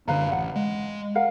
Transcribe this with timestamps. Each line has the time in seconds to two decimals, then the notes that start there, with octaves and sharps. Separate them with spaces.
0.08 F#2 D3 D4 B4 F5 A#5
0.32 A1 F#5
0.55 G#3
1.15 A#4 F5 F#5